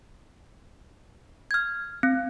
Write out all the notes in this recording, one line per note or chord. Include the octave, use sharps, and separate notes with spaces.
F6 G#6
C4